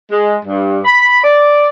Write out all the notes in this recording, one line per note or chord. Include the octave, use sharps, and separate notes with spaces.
G#3
G2
B5
D5